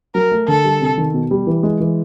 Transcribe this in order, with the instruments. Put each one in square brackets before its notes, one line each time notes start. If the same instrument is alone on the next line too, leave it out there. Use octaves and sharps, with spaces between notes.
[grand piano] F#3 [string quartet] A#4
[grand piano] A3
[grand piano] D3 [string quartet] A4
[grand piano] G3
C3
D#3
B2
G3
E3
G#3
E3